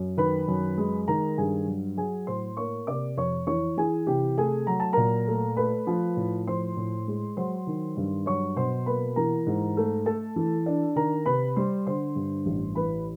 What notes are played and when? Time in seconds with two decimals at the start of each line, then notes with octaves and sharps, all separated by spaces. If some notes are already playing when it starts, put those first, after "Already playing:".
Already playing: F#2
0.17 D#3 B4 B5
0.48 F#2
0.78 G#3
1.08 D#3 A#4 A#5
1.38 G2 G#4 G#5
1.67 F#3
1.97 F#3 G#4 G#5
2.27 A2 C5 C6
2.57 A#3 C#5 C#6
2.87 C3 D5 D6
3.17 F2 C#5 C#6
3.47 E3 C#5 C#6
3.77 E3 G#4 G#5
4.07 C3 G4 G5
4.38 A3 G#4 G#5
4.67 F#3 A#5
4.80 A5
4.93 A#2 A#4 A#5
5.27 A3
5.56 A3 B4 B5
5.87 F3
6.16 A2
6.47 F3 C5 C6
6.76 A2
7.07 G#3
7.37 F#3 C5 C6
7.67 D#3
7.97 G2
8.26 F#3 C#5 C#6
8.56 B2 C5 C6
8.86 A#3 B4 B5
9.16 E3 A#4 A#5
9.47 G#2
9.77 A3
10.06 A3 A4 A5
10.36 E3
10.66 D4
10.96 D#3 A#4 A#5
11.26 C3 B4 B5
11.56 G3 C5 C6
11.86 D3 C5 C6
12.15 G2
12.46 A1
12.75 E3 B4 B5